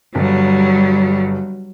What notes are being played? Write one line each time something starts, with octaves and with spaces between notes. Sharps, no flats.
G1 F#3 G3